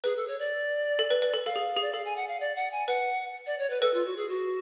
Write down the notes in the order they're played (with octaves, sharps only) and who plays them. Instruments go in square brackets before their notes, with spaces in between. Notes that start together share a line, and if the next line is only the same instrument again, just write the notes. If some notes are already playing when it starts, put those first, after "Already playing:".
[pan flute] G#4 [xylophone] B4
[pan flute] A4
C#5
D5
[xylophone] A4
B4
B4
A4
[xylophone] A4 [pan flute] F5
[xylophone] G#4
G#4
[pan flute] D5
[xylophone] A4 [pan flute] F5
[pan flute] G#5
F#5
F5
D5
F#5
G#5
[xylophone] B4 [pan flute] F#5
[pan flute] D5
C#5
B4
[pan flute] A4 [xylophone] B4
[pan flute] F4
F#4
G#4
F#4